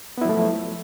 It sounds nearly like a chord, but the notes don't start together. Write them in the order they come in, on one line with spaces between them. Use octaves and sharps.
B3 E4 F#3 A3 F3